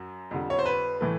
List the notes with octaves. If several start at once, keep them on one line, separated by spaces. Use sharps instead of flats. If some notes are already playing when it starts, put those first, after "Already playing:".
Already playing: F#2 F#3
F2 D3 G3
C#5
C5
B4
A2 E3 A3